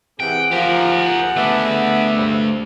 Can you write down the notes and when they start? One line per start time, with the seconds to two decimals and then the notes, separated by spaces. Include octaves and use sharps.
0.20 C3 E3 G#4 F#5 G5
0.51 F3 G4 A#4
1.37 A3 B3 D4 E5
2.16 G2 C3